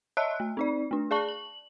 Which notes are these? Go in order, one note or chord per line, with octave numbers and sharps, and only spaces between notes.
C#5 D#5 E5 A5 E6 F#6
A3
C4 D#4 D5
A3 D4
G#4 D5 A5 C#6 F#7
F#7